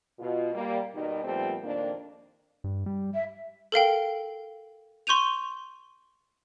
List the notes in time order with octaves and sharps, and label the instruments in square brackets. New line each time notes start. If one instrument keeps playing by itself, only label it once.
[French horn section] B2 F4
G3 A#3
B2 D#3 G3
A#2 F3 G3 A3 B3 C4
F2 A#2 D#3 A#3 D4
[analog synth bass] G2
G3
[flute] E5
[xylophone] A4 A#4 F5 G5
C6 C#6 G6 D#7 F7